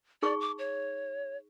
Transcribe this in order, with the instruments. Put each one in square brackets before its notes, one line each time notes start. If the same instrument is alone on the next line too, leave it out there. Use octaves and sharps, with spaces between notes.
[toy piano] D#4 G#4 C#6 [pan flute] D5
[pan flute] D6
C#5